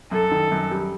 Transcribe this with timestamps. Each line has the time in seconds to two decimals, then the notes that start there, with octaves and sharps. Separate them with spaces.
0.11 F#2 A4
0.31 D#3
0.52 F#2
0.71 G3